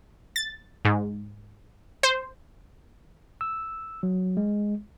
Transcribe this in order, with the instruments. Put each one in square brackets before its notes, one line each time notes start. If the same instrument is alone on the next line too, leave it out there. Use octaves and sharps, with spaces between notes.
[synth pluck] A6
G#2
C5
[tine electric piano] E6
F#3
G#3